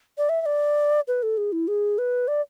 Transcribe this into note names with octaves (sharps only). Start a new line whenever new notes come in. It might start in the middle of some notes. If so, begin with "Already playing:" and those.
D5
E5
E5
D5
B4
A4
G#4
E4
G#4
B4
D5